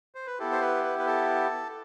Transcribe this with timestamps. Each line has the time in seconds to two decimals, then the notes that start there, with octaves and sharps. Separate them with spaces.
0.15 C5
0.27 B4
0.39 B3 E4 G4 A4
0.52 C5
0.61 B4
0.84 B4
0.99 B4
1.07 A4